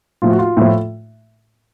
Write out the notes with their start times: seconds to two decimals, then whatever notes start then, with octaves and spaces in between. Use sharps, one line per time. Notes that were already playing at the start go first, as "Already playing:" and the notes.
0.22 A2 F3 A3 F4
0.30 F#4
0.39 F4
0.57 A2 F3 A3